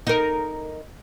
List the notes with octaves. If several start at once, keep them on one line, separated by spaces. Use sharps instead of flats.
D#4 A#4